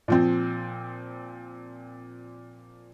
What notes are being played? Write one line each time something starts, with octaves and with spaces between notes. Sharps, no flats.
A#2 F3 C4